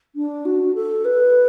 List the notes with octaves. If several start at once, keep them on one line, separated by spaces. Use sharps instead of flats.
D4
F#4
A4
B4